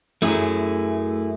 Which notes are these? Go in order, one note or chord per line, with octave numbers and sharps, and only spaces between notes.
F#2 A3 E4 G#4